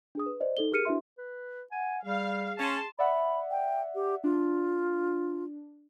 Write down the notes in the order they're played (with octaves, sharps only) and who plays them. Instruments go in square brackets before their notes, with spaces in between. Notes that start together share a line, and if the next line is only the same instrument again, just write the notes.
[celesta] D4 G#4 D#6
B4
C5 D5 D#5
D#4 A4 G7
G4 G#4 A#4 F6 C#7 D#7
D4 E4 F#4 B4 E5 C6
[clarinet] B4
[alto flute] F#5 [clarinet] G#5
[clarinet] G3 [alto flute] G#4 [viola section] F5
[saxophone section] C#4 [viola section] A5 C6
[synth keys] D5 E5 F#5 [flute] B5
[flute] G5
G4
[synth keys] D4 [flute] F4